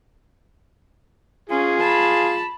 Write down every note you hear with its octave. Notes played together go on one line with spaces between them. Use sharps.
C#4 F4 G#4
A5 B5